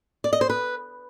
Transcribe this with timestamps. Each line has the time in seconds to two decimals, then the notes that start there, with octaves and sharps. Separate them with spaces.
0.24 D5
0.33 D#5
0.41 C5
0.50 B4